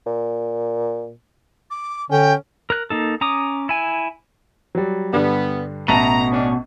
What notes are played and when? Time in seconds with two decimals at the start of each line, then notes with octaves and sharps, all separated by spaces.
0.06 A#2
1.70 D6
2.10 D3 C#4 G5
2.70 A#4 F#6
2.90 A#3 D#4 A4
3.21 C#4 A#5 D6 D#6
3.69 E4 G#5
4.75 F#3 G3
5.13 G2 D3 G3 B3
5.88 A1 B2 E5 A5 A#5
6.32 C#4 D4